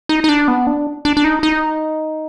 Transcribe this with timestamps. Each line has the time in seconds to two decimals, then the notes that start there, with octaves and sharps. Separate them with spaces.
0.09 D#4
0.24 D#4
0.29 D4
0.48 B3
0.67 D4
1.05 D4
1.17 D4
1.24 D#4
1.43 D#4